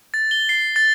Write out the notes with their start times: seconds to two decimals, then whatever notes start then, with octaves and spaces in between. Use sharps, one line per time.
0.14 A6
0.31 G7
0.49 C7
0.76 A6